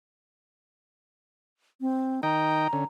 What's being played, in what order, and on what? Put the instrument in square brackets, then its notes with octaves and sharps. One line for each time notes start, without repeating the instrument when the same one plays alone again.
[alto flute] C4
[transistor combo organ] D#3 D#5 G5 [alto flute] A#5
[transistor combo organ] D3 C#4